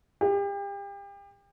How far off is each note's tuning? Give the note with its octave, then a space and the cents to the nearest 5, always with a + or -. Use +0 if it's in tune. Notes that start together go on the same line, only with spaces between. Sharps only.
G4 +35